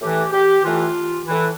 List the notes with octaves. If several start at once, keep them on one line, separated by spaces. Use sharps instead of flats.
A2 E3 G4
G4
A2 E3 F4
A2 E3 E4